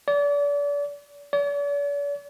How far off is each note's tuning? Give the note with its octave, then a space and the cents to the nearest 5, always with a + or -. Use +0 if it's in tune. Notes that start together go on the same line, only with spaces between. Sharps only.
D5 -35
D5 -45